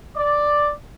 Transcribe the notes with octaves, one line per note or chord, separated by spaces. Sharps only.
D5